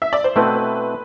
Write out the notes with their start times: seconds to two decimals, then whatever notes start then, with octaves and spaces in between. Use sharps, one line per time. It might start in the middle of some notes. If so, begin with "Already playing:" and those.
0.02 E5
0.13 D5
0.24 C5
0.36 B2 A3 C4 E4 B4